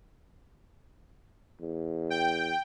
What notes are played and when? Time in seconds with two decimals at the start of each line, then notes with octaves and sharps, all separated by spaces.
1.61 E2
2.10 G5